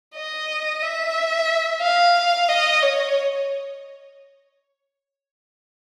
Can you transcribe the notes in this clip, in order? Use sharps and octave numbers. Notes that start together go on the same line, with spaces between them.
D#5
E5
F5
D#5
C#5